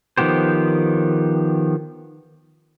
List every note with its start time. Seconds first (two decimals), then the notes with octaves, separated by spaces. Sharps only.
0.17 D#3 F3 B3 G4 C5